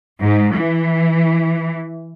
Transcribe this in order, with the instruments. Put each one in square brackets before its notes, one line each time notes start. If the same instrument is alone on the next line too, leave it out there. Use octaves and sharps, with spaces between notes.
[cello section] G#2
E3